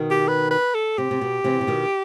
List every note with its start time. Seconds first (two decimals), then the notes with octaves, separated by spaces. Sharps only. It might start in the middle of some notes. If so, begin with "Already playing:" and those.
Already playing: B2 D#3
0.11 G4
0.28 B4
0.51 B4
0.74 A4
0.98 C3 G4
1.11 C3
1.21 B2
1.44 C3 E3
1.61 C3
1.67 B2 D#3